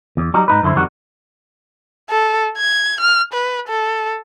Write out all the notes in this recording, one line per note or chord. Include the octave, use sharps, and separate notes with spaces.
E2
F#3 G3 D#4
G#2 D#4 B4
F#2 D3 E4 C5
F2 D#3 G3 F#4
A4
G#6
F6
B4
A4